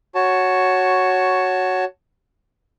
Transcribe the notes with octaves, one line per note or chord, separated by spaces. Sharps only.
F#4 C#5 A5